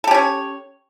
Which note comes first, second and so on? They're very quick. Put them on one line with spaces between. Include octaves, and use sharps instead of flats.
A4 G4 C#4 C#5